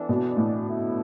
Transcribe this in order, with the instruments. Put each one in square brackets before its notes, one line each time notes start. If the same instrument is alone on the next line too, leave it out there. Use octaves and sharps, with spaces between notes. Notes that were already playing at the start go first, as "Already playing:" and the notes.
Already playing: [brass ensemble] E3 B3 D4 A4
[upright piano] B2
A2
[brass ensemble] D3 A3 E4